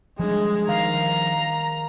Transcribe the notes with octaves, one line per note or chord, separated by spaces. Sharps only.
F3 G3 G#3 D4
D#3 F5 A#5